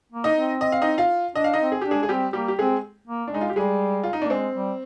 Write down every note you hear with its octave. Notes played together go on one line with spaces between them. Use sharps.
A#3
D#4 D#5
C4
D#5
F5
D#4 D#5
F4 F5
D4 D#5
F5
D#4 D#5
C4
G#4
D4 G4
G#3 G#4
G#4
G3 C4 G4
G3 A#3 G4
G4
G#3 C4 G#4
A#3
D4
G#3 D#4
F4
G4
G3 G#3 G#4
F4
D#4
A#3 D4
G#3 C4
G3